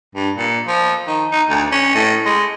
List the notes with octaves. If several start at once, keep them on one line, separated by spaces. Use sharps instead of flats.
G2
A#2
F3
D#3
D#4
D2
C#4
A2
G#3